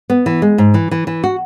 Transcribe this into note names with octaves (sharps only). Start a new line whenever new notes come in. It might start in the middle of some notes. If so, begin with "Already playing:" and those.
B3
E3
G#3
G#2
E3
E3
E3
F#4